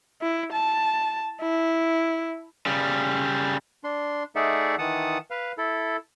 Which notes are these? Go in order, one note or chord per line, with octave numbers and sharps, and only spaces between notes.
E4
A5
E4
C#3 G3
D4 C6
A3 D#4 G#4 D5 E5 F#5
D#3 E3 F#5 A5 D#6
B4 F5
E4 A4